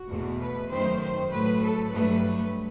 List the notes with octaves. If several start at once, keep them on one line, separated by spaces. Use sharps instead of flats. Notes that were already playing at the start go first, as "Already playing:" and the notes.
Already playing: F#4
E2 B2 A3
B4
F#2 D#3 A3 C5
C5
A2 F#3 A3 B4
A4
G2 F#3 A3 B4